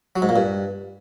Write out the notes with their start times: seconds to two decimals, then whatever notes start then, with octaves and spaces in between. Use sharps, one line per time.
0.16 F#3
0.22 G#2
0.29 A#2
0.36 G2